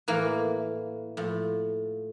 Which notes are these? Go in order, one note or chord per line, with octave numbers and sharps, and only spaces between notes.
A2 E3 A#3
A2 F3